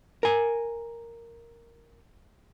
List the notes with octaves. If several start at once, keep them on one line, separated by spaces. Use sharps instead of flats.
A#4 G#5